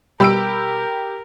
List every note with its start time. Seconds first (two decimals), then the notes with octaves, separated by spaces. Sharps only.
0.20 B2 G3 G4 A#4 B5 E6 D7